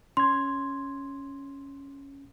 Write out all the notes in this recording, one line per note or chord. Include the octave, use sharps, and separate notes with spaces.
C#4 C6 G#6